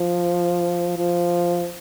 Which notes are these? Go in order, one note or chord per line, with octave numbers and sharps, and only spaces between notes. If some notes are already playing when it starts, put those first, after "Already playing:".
Already playing: F3
F3